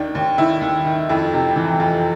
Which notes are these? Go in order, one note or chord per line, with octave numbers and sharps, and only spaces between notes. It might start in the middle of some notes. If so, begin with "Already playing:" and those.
Already playing: D#2 D#3 D4
D#2
D#3 E4
D#2
D#3
F2 E4
C3
E3
F2